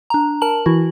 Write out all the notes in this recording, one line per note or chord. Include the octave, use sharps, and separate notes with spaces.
D4 A#5
A#4 A5 F#7
E3 E4 F#4